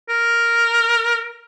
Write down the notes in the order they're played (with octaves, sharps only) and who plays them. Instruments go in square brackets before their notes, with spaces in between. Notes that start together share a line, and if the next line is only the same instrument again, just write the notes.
[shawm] A#4